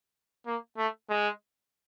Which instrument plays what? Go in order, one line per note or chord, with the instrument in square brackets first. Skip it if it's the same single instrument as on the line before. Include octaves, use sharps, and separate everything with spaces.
[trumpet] A#3
A3
G#3